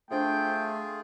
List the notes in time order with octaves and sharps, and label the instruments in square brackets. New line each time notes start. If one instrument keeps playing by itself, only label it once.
[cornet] A3 [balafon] D4 C5 E5 [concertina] F4 G#4 [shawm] G5